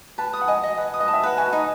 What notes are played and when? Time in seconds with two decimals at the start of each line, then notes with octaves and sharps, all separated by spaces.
0.18 B4 A5
0.33 D#6
0.42 F#5
0.48 D#5 G#5
0.63 D#5
0.78 B4
0.94 D#6
1.00 D#5
1.08 A5
1.14 E5
1.23 B4 F#5
1.38 F#4 G#5
1.53 D#4